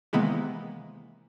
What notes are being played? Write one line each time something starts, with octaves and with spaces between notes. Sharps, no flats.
C3 D#3 E3 G#3 A#3 B3